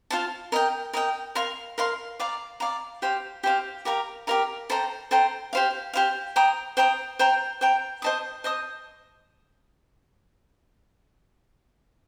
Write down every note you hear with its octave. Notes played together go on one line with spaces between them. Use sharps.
F4 C5 F5 A5
A#4 D#5 G5
A#4 D#5 G5
A#4 F5 C6
A#4 F5 C6
D5 F5 A#5
D5 F5 A#5
G4 C5 F5
G4 C5 F5
G4 A#4 F5 A#5
G4 A#4 F5 A#5
A4 C5 G5 A#5
A4 C5 G5 A#5
G4 C5 F5
G4 C5 F5
C5 G5 A#5 D#6
C5 G5 A#5 D#6
C5 G5 A#5
C5 G5 A#5
C5 D#5 A5 D#6
C5 D#5 A5 D#6